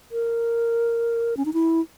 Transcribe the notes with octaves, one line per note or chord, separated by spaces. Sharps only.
A#4
C#4
D#4
E4